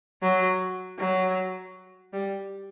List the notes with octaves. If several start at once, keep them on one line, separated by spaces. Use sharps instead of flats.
F#3
F#3
G3